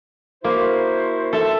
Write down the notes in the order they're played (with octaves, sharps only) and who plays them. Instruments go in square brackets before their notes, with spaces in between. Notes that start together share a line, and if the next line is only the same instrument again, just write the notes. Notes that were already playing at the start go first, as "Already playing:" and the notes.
[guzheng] A#3 [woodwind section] E4 F#4 C5
[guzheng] A4 E5